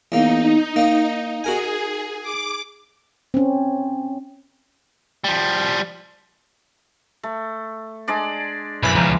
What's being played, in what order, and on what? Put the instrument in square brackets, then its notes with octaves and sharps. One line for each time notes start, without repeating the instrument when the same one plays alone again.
[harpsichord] E2 A#3 [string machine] D#4
[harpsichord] A#3 D#5
[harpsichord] F#4 A#4 G#5 [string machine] G#4
[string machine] D6
[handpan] C4 C#4
[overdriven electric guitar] F3 G3
[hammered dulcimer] A3
G#3 D4 D5
[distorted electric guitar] B1 F#2 [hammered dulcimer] E3 [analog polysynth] B5
[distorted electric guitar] C#2 B2 [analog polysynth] F3 [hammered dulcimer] A#5